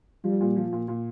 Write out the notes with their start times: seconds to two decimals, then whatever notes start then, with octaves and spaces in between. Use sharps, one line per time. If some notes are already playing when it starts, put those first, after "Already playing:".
0.24 F3 G3
0.41 A#2
0.56 F3
0.72 A#2
0.88 A#2